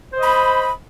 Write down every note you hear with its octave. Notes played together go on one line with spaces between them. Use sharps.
C5 D#5 B5